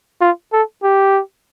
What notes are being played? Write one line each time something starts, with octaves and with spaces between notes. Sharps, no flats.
F4
A4
G4